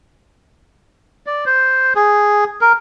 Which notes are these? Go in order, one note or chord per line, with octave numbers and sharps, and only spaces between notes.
D5
C5
G#4
A#4